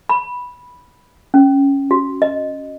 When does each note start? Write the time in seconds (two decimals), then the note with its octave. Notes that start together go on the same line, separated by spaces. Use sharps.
0.09 B5
1.34 C#4
1.91 F#4
2.22 D#5